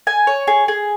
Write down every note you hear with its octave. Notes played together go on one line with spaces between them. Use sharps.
G#5
C#5
G#4
G#4